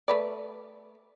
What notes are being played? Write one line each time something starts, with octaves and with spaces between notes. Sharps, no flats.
A3 B4 D5